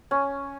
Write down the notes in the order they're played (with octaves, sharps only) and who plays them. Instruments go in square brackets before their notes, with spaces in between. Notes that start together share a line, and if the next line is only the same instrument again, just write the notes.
[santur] C#4